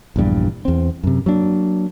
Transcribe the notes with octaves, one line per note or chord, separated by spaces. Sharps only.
A#1 E2 G2 G3
E2 C4
F#2 C3
F#3 A#3 D4